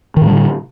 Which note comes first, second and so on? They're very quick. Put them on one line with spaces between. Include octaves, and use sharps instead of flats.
D#3 A2 G3 D3